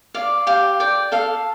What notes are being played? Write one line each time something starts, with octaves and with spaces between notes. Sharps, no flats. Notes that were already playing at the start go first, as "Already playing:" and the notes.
D5 F5
G4 F5
D5 G5
A4 F5